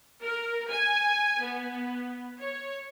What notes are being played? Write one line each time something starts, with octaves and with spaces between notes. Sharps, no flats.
A#4
G#5
B3
C#5